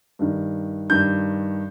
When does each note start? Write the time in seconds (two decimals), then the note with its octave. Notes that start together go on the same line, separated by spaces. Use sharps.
0.19 G2 D#3
0.90 G2 D#3 G6